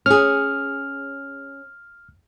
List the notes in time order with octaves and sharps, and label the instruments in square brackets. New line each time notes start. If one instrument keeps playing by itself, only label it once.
[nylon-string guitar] C#4 G#4 [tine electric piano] F6